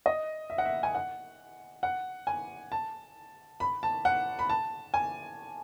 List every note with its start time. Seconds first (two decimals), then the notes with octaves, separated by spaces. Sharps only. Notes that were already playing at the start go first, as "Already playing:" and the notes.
0.06 D#5
0.50 E5
0.58 F#5
0.65 E5
0.83 G#5
0.95 F#5
1.83 F#5
2.27 G#5
2.72 A5
3.60 B5
3.83 A5
4.05 F#5
4.39 B5
4.50 A5
4.94 G#5